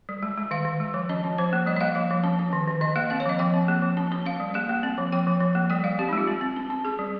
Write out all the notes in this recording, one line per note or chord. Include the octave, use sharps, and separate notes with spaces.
G3
G#3
G#3
D#3 F5
D#3
G#3
F3
C#4 D#5
C#4
F3 C5
A#3
G3 D#5
D#5
A#3 F5
F3 F5
F3
C#4
C#4
D#3
D#3
D#3 D#5
A#3 F5
C4 F5
C#5
F3 D#5
F3 G5
C4
A#3
F3
C#4
C#4
C#4 F5
G3
A#3 F5
A#3
C4
F3
F3 G5
F3
F3
A#3
G3 G5
G3 F5
C4 G4
D#4
G#3 F4
C4
C4
C#4
C#4
C#4 G#4
G3